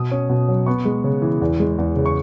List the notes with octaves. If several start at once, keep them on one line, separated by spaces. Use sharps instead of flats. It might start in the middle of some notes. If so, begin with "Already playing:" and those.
Already playing: B2 D#6
C#4
B2
F#3
B3 C#6
G#3
C#3
E3
E2
G#3
E2
C#3
C#6